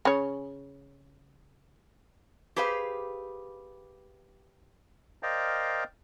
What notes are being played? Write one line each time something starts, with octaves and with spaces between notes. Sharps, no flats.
C#3 C#5
G4 G#4 B4 C5 F5
A#4 C5 D5 D#5 F5 G5